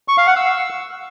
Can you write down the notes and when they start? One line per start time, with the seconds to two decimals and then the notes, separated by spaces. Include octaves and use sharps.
0.08 C#6
0.18 F5
0.27 F#5
0.36 E6